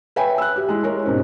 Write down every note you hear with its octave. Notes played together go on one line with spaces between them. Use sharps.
B4 C#5 E5 G5 G#5 B5
E6 F#6
G4
G#3 E4
G#3 E4 A#4 C#5
G#2 B2 C4 C#4